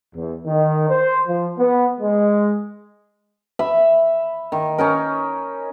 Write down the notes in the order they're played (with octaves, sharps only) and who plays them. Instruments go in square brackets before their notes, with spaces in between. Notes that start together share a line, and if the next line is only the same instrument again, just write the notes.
[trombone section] E2
D#3
C5
F3
B3
G#3
[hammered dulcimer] E5 B5
D#3
C#4 D#4 A#4